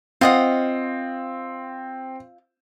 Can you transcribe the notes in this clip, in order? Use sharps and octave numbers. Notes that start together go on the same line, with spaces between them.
C4 F4 D#5 F#5